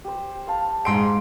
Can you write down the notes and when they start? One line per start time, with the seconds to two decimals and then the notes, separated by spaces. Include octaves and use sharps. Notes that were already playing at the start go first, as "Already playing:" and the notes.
0.05 G4 C5
0.47 C5 F5 A5
0.85 G#2 G#3 C6 D7